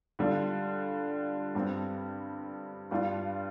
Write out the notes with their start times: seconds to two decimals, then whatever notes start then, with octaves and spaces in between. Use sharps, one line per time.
0.19 D3 G3 D4 F4
1.55 G2 G3 C4
2.91 G2 G3 D4 F4